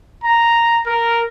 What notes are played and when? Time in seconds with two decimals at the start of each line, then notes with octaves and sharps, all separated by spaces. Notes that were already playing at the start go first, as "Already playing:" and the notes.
0.24 A#5
0.86 A#4